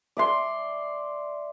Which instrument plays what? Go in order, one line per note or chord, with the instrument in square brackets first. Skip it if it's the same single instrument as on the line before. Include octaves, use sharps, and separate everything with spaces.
[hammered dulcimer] D5 E5 C6